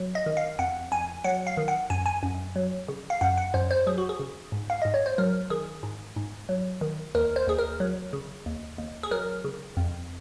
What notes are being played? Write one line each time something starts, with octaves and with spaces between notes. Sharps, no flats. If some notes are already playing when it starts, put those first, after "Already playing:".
Already playing: F#3
D#5
D#3
F5
F2 F#5
F2 G#5
F#3 F#5
F5
D#3
F#5
F#2 G#5
G#5
F#2
F#3
C#3
F5
F#2 F#5
F#5
F#2 C5
C5
F#3 G#4
F#4
G#4
C#3
G#2
F5
G#2 D#5
C#5
C5
F#3 A#4
D#3 G#4
G#2
G#2
F#3
D#3
D#2 A#4
C5
D#2 G#4
A#4
F#3
C#3
D#2
D#2
G#4
F#3 A#4
C#3
F2